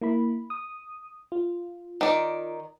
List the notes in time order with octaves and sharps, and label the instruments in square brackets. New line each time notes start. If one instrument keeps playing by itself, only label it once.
[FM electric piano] A#3 E4 B5
D#6
F4
[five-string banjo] D#3 D5